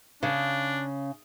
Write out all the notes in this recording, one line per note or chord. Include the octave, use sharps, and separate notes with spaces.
C#3 D4